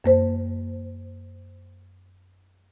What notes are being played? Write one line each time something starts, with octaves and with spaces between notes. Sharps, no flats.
F#2 A#3 C5